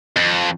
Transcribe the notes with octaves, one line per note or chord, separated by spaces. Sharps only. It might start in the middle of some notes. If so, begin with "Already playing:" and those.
F2